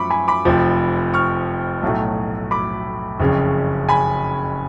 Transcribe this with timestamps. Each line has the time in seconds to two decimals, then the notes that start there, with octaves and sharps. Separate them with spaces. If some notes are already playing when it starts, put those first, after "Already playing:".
Already playing: F#2 F3 A3 B5 C#6 D6
0.10 G#5 B5
0.28 B5 D6
0.45 F1 F2 F3
1.14 C#6 F6
1.83 B1 A2 F#3 A3
2.51 B5 D6
3.20 F#1 F2 C#3
3.89 G#5 B5